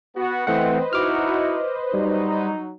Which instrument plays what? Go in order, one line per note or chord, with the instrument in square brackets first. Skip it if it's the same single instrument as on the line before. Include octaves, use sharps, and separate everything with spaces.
[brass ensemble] B3 F#4
[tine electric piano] E3 A3 F#5 [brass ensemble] C4 [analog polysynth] B4 C5 D#5
[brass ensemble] D#4 E4 F#4 [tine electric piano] D6 F6
[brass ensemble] F#3 D#4 [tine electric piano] G3